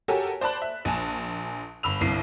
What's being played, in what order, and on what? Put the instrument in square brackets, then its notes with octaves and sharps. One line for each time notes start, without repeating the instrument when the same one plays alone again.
[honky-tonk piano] F#4 G4 A4 A#4 C#5 G#5
C5 D5 A5 B5 F#6
E5
A#1 G#5 A5
G1 B5 E6 F7
G1 C2 E4 C7